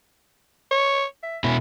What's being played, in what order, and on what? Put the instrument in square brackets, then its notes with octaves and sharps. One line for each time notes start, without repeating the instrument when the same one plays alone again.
[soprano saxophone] C#5
E5
[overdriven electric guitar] B2 E4 [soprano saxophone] C#4